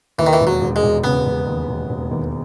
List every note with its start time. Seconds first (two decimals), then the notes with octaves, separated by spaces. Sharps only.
0.18 D#2 E3
0.27 D#3
0.33 E3
0.41 E1
0.47 F#3
0.61 E1
0.76 G#3
0.83 E1
1.04 C#3 B3
1.26 E1
1.47 D#2
1.68 E1
1.89 E1
2.11 D#2